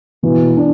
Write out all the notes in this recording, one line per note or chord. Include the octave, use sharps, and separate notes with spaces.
B2 E3
D4